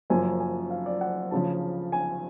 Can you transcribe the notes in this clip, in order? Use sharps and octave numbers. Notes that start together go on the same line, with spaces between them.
F#1 F#2 F3 G#5
G#5
F5
D5
F#5
D2 C#3 F3 A5
G#5